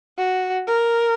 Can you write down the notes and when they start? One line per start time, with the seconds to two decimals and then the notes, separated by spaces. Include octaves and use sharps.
0.18 F#4
0.67 A#4